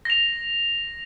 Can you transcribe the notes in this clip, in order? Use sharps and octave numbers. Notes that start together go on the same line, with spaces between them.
A#6 F7